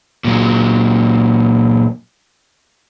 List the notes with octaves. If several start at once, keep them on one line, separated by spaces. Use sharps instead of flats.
A#2 F#3